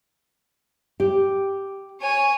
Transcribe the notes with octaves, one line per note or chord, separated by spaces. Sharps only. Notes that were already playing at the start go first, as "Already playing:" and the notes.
G4
C#5 G#5